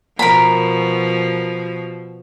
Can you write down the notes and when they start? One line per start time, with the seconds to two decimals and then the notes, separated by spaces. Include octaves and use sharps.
0.19 B2 F3 A#4 B5